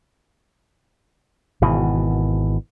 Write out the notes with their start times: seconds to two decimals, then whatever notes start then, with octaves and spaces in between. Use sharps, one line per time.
1.62 G#1 B2 E3